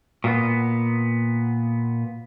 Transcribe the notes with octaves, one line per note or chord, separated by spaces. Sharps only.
A#2 B3